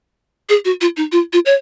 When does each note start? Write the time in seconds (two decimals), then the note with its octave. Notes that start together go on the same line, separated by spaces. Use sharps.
0.49 G#4
0.65 F#4
0.81 F4
0.97 D#4
1.12 F4
1.33 F4
1.46 C#5